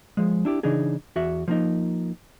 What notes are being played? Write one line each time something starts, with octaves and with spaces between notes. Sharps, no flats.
F3 G#3
D4 E4 G4
C#3 E3 D4 D#4 G#4
E2 F#4 E5
F3 A#3 D#4